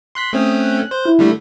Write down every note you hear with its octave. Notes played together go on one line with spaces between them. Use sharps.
C6 F#6 B6
A3 C4 C#4 D#6
F#6
C5
E4
D3 G3 A3